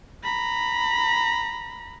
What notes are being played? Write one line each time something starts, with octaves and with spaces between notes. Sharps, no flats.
A#5 B5